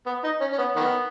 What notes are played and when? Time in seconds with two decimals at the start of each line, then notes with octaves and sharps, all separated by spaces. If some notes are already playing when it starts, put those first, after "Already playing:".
0.06 B3
0.24 D#4
0.41 C#4
0.52 C#4
0.58 B3
0.75 D#3 B3